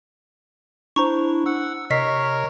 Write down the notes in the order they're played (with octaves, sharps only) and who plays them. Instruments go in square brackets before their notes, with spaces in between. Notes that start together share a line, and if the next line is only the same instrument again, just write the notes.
[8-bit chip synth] D4 E4 [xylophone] C5 A#5 C#6
[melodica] F#5 [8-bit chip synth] E6
[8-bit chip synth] C3 [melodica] A#4 C#5 [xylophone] D#5 B6 C7